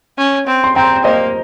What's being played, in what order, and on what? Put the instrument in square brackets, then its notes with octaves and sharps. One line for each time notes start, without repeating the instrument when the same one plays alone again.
[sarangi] C#4
C4
[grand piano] C6
[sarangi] C4 [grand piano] G5 A#5
[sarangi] A#3 [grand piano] C5 D#5